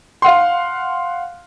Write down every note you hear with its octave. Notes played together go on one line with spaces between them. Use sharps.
F5 F#5 C6